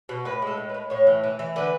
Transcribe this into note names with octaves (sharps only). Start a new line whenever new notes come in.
B2
A2 B4
G#3 A4
A2
B4
A2
A2 C#5
E3
E3
E3
D3 B4